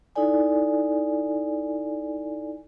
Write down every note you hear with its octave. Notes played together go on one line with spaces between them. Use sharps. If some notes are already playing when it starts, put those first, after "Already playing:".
D#4 E4 A4 D5 G#5